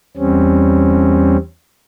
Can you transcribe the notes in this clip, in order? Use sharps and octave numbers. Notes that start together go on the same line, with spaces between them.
E2 G3 C4 C#4